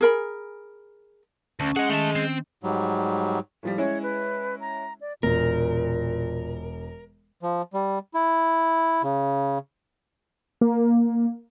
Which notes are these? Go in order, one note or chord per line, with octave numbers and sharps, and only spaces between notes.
G#4 A#4 B5
D2 C#4 A5
G#4 D#5 F#5
D#3 A3 A5
C4
G#2 F#3 G3
A2 F3 G3
G#3 C#4 E4 C#5
B4
A#5
D5
E1 A#2 A#4
F3
G3
E4
C#3
A#3